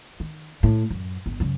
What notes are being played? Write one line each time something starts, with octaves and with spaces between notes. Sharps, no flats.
D#3
A2
F#2
G1
F#2 C#3